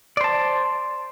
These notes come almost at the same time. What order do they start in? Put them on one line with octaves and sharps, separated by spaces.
D5 C5 A5